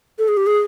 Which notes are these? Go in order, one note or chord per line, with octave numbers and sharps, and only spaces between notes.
A4
G#4
G4
G#4